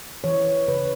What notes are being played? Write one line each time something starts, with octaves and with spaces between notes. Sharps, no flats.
E3 C#5
C#3 B4